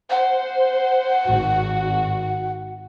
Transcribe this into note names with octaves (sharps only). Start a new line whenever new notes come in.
C5 F#5
G#1 F#4